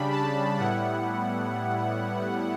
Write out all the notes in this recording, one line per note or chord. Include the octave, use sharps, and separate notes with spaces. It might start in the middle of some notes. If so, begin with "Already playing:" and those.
Already playing: C#3 G3 D4 B5
A5
A2 G3 B3 E4 F#5